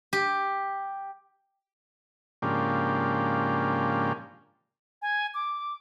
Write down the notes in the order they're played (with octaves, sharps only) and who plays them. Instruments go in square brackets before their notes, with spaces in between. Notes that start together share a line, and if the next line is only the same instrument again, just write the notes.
[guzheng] G4
[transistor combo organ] G#2 C#3 F3 A#3 D4 G4
[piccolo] G#5
D6